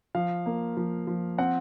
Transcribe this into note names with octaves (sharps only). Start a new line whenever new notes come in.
F3 F5
A#3
F3
F3
C4 F#5